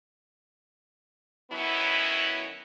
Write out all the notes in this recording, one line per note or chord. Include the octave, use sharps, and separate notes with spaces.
D#3 F#3 B3 C#4 E4